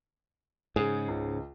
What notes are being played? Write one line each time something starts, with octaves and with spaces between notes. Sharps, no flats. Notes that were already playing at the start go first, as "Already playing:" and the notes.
G#2 C#3 G#4
C#2